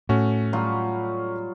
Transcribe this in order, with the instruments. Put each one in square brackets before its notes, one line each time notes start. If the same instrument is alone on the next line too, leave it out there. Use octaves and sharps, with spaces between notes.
[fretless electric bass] A2 [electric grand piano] A3 C#4 F#4
[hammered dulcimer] F#3 G3 F4